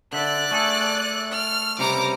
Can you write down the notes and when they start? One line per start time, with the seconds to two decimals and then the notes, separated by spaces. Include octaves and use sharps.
0.13 D3 D5 E5 F#6
0.51 A3 G#4 A4
1.32 F6
1.79 C#2 C3 G3 A#5 D6